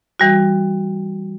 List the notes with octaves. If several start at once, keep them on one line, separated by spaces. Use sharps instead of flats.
E3 G3 F#4